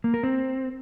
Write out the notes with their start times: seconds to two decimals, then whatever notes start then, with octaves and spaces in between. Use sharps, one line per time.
0.04 A#3
0.14 A#4
0.23 C4